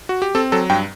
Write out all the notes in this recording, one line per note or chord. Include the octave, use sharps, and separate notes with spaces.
F#4
G4
C4 A4
F#3 A4
G2 G5